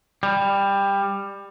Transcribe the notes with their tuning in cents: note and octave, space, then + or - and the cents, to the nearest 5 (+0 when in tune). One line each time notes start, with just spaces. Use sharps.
G3 +15